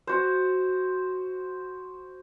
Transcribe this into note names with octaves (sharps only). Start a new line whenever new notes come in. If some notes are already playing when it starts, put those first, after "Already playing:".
F#4 C5